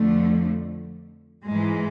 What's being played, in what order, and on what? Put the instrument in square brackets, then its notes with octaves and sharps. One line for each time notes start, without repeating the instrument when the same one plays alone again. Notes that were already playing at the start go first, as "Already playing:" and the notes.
Already playing: [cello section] F2 D3 F3 A3
G#2 E3 G#3